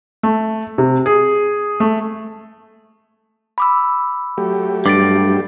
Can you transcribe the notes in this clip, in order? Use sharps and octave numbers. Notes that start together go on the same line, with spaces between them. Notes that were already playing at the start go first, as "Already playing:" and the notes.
A3
C3
G#4
A3
B5 D6 E6
F#3 A3 G4
G2 D6 A6 D7